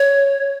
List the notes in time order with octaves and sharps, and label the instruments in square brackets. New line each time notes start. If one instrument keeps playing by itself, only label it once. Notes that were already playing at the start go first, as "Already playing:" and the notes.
Already playing: [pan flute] C#5